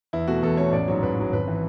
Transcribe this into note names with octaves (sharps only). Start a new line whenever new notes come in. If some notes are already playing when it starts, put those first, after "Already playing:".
E2 E4
B2 A3 F#4
E2 A4
B2 A3 C#5
A1 D5
G#2 F#3 C#5
A1 B4
G#2 F#3
G#1 B4
E3